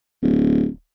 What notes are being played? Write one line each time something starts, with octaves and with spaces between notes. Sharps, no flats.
D1